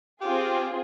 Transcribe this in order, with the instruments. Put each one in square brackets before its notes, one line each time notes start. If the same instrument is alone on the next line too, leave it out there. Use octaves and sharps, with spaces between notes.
[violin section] C4 F4 G#4 [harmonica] G4